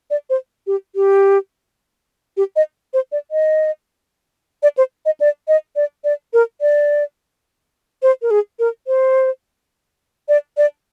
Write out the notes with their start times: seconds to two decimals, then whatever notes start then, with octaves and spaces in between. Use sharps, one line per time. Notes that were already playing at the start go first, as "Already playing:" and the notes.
0.10 D5
0.30 C5
0.67 G4
0.95 G4
2.37 G4
2.56 D#5
2.94 C5
3.12 D5
3.31 D#5
4.63 D5
4.78 C5
5.06 D#5
5.20 D5
5.48 D#5
5.76 D5
6.04 D5
6.33 A#4
6.61 D5
8.02 C5
8.22 A#4
8.31 G#4
8.59 A#4
8.87 C5
10.29 D5
10.57 D5